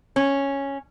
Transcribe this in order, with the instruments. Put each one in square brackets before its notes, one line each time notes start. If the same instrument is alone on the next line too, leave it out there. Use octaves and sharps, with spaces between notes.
[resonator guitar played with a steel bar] C#4